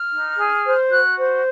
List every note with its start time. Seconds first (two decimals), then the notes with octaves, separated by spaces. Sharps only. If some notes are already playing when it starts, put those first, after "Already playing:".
Already playing: F6
0.13 D#4
0.38 G#4
0.64 C5
0.91 F#4 F#6
1.16 C5